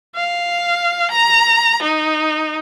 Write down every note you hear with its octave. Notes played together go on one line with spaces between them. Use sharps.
F5
A#5
D#4